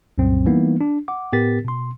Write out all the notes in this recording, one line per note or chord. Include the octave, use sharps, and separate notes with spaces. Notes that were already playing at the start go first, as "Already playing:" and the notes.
C2 F#2 A#2 F#3 C4
E3 G3 A#3 B3 D#4
D4
F#5 D6
A2 B3 G4 A#4 A6 B6
B2 C6